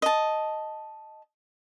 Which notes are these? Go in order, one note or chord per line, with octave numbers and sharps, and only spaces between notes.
D#5 A5